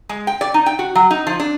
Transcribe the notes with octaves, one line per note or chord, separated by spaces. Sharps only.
G#3
G5
D5
D#4
G5
F#4
F#3
D#4
F3
D4